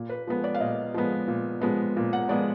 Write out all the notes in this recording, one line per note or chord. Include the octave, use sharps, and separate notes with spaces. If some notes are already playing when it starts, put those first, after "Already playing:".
Already playing: A#2
B4
F3 G#3 B3
D5
F5
A#2 D#5
F3 G#3 B3
A#2
F3 G#3 B3
A#2
F#5
F3 G#3 B3 D5